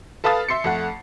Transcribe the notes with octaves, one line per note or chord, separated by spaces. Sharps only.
A4 B4 F5 A5 D#6 A6
E5 C6 C7 C#7
F2 A3 F#5